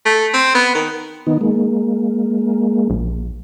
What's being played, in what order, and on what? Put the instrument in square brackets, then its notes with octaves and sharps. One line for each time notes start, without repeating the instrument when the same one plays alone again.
[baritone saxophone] A3
C4
B3
D#3
[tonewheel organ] D#3 B3 D#4
G#3 A#3
[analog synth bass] A#1